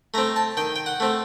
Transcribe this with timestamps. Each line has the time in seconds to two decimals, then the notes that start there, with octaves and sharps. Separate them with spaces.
0.14 A3 C4 A#5
0.36 A5
0.57 D#3 G5
0.76 G5
0.86 F#5
1.00 A3 C4